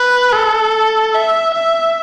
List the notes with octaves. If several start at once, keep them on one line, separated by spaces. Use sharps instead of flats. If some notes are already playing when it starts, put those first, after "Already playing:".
Already playing: B4
A4
E5
E5